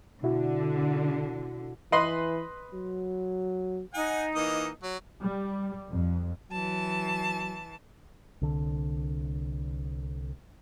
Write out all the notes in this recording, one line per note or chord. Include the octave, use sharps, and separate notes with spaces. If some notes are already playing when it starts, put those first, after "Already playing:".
B2 D3 E4 F#4
E3 B4 D#5 C6
F#3
D#4 F#5 G#5
E3 A#3 D#5
F#3
G3
F2
E3 F#3 A5
C2 D3